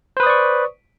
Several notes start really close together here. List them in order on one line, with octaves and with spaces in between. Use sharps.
C5 B4 D#6 D5 C#6